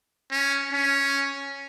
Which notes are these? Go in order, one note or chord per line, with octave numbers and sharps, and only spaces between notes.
C#4
C#4